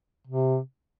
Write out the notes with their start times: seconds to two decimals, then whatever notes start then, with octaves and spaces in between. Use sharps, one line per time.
0.28 C3